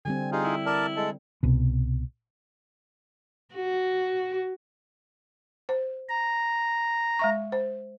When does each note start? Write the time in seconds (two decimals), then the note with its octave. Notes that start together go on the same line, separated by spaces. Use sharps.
0.05 D3 G3 C4 G#5
0.32 D#4 F4 G4 G#4
0.44 E4
0.66 A#4 D5 A5
0.96 G#3 A4
1.43 C2 B2
3.55 F#4
5.69 C5
6.09 A#5
7.19 G#3 E5 C#6
7.52 C5